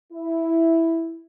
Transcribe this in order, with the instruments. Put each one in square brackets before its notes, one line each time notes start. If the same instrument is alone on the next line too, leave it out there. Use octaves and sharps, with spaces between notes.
[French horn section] E4